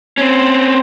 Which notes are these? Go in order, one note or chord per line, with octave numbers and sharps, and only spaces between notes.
C4 C#4